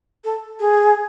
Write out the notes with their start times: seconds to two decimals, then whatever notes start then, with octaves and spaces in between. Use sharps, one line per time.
0.24 A4
0.60 G#4